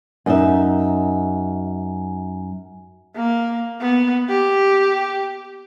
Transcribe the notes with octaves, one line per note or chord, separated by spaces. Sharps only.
F#2 D#4 E5
A#3
B3
G4